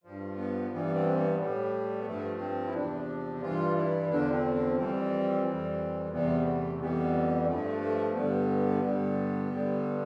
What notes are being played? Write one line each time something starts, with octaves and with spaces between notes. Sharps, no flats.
G2 F3
B3
G2 E3 G3 B3
C4
B3
A2 G3
B3
G2 F3 A3
C4
E4
E2 C3 F3 D4
G2 E3 G3 F4
E4
E2 D3 F3 D4
C4
C4
F2 E3 G3 C4
F2 E3 G3
E2 C3 E3 G3 B3
A3
F2 E3 G3 B3
G3
G2 F3 A3
A3
G2 D3 G3 B3
G2 D3 G3
G2 D3 G3